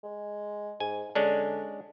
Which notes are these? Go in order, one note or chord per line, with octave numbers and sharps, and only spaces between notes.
G#3
G#2 G#5
D3 G#3 C#4 D4